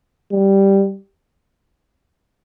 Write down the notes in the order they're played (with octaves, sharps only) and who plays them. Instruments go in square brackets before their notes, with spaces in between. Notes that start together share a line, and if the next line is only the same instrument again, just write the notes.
[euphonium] G3